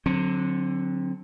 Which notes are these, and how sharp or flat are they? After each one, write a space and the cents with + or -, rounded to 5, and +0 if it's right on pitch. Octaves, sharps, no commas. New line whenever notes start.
D3 +0 F#3 -15 C4 +20